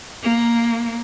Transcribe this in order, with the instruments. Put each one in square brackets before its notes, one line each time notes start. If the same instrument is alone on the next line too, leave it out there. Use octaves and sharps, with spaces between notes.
[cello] A#3